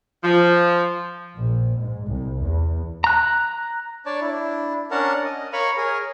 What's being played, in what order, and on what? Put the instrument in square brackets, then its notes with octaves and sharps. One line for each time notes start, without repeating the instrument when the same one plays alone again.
[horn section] F3
[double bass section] A#1
G#2
C2
E2
[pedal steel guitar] A#5 F#6
[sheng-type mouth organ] D4 C#5 D5 A5
D4 E4
C#4 D4 A#4 F#5 A5
D#5
A#4 C#5 F5 B5 C#6
G#4 A#4 C#5